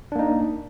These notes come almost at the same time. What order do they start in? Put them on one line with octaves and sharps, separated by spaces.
D4 A#3 D#4